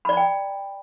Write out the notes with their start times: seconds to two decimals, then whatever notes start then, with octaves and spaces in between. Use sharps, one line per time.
0.05 B5
0.09 D5
0.13 A#5
0.17 G5